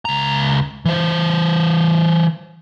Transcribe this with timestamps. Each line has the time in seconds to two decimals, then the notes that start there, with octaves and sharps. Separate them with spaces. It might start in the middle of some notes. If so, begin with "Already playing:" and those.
0.05 C#2 A#5
0.85 E3 C5